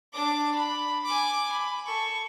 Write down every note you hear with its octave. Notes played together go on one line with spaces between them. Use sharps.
D4 D6
B5
G#5 D6
B5
A4 C#6